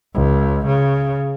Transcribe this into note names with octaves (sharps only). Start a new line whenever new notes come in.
C#2
C#3